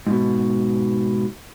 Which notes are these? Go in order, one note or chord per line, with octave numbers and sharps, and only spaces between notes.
G#2 B2